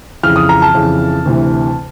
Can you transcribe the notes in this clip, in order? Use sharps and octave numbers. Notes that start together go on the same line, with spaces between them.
F2 C#3 E3 F6
D#6
A#5
A5
F2 C#3 E3
D2 C3 E3